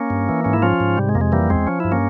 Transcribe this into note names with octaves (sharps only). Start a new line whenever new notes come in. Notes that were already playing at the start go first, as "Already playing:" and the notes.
Already playing: A#3 C#4
G2
E3
G#2 C#4
E4
F3 C#4 F4
G#2
C3 G3
G#3
F2 A#3
G#3
E3 G3 A#3
E2 G#3 C4
F3 C#4
G2 E4
A#3 C#4